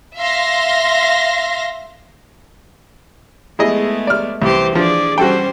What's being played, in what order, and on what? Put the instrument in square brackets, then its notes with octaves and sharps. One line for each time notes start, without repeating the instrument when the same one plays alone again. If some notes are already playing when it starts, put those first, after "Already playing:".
[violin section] E5 F5 C6 A#6
[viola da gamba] G#3 A3 B3 [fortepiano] E4 G#4 D#5
[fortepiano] D5 F6
[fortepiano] C2 [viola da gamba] E3 G4 C5
[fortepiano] F3 [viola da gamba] D4 G#4 D5
[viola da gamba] G3 C#4 C5 [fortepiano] F#4 A4 G5